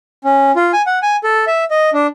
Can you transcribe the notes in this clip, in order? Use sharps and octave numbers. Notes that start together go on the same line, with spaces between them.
C#4
F4
G#5
F#5
G#5
A4
E5
D#5
D4